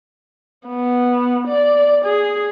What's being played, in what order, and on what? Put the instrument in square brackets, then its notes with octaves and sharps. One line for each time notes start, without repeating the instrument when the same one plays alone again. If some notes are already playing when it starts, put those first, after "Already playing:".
[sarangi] B3
D5
G#4